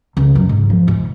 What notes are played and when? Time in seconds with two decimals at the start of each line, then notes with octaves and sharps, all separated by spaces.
0.17 C#2
0.35 F#2
0.49 G#2
0.70 F3
0.88 G#2